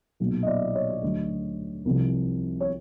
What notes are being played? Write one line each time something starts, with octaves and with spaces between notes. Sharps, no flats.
B1 A#2 F#3
D#5
D5 E5
C#5 D#5
D2 D3 F#3
C2 C3 F3
C#5